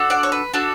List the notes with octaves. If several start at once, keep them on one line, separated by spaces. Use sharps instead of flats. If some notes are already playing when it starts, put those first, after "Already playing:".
Already playing: D4 F#4 A4
D5 F#5
C#5
B4
D4 F#4 A4